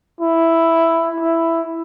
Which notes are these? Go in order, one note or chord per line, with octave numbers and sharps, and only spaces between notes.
E4
E4